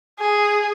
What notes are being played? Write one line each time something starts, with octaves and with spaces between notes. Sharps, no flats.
G#4